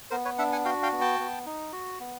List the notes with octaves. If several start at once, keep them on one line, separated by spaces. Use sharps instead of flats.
B3 A#4 C5
B4 C#5
D4 E5 F#5
F#5 G#5
F#4 F5 G5
F5 G5
B3
G5 A5
B3
D#4
F#4
B3